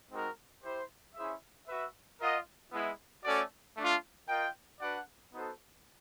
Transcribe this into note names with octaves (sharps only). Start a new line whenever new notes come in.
G#3 C4 D#4 F#4 A#4
E4 G4 C5
C#4 E4 G#4 C5 E5
F#4 B4 E5
F4 A#4 D#5 F#5
G#3 B3 E4
A3 C#4 F#4 A4 D5
A3 D4 F4
F4 A#4 D#5 G5
D4 F#4 B4 D5 F#5
B3 D#4 F#4 A4 C5